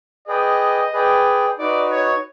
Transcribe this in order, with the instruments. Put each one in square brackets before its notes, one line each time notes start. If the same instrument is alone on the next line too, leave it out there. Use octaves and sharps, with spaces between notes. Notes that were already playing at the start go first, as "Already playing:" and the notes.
[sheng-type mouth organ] G#4 B4 D5 G5 [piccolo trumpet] D#5
[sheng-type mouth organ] G#4 B4 D5 G5
[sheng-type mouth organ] D#4 F#4 B4 [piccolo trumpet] D5
[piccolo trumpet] C#5